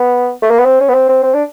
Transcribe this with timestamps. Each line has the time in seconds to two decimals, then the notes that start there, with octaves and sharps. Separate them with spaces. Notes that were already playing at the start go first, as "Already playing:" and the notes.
Already playing: B3
0.42 A3
0.51 A#3
0.59 B3
0.65 C4
0.80 C#4
0.89 B3
0.94 C4
1.09 C4
1.23 C4
1.34 D4